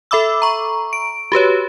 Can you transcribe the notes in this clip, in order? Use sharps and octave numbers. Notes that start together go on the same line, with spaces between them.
A4 E5 B5 D6 E6
A#5 C#6
D7
F#4 G4 B4 C#5